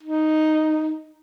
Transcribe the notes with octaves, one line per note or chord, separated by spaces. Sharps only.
D#4